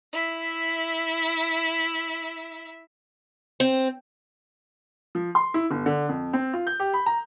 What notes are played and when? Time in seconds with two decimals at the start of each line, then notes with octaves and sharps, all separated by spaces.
0.13 E4 E5
3.60 C4
5.15 F3
5.35 C6
5.54 E4
5.71 G1
5.86 D3
6.09 F2
6.33 C4
6.53 F4
6.67 G6
6.80 G4
6.94 B5
7.06 A#5